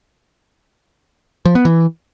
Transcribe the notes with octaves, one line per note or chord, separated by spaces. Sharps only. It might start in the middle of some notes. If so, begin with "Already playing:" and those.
F3
B3
E3